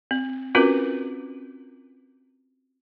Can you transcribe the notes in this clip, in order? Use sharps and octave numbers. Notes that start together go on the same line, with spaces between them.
C4
C4 C#4 F4 F#4 A#4 B4